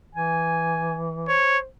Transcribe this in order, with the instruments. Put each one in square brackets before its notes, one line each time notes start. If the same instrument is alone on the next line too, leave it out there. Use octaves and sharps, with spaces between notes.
[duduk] E3 [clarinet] G#5
[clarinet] C5 [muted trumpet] C#5